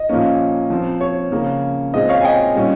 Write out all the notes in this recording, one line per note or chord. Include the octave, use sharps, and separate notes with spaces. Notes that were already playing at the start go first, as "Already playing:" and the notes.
Already playing: D#5
A#2 F3 A#3 C#4
F3 C4
C#5
C#3 F3 A#3 C#4
A#2 G#3 C4 D#5
C#5 F5
G#5
D#5 G5
A#2 G3 C#4